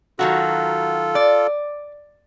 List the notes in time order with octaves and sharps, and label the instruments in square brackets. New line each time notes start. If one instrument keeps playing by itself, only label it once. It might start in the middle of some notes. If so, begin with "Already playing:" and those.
[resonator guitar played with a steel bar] D#3 F#3 F#4 [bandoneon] F4 A4
[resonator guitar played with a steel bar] D5